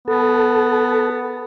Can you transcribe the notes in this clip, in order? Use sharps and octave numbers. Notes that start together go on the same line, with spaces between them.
B3 A4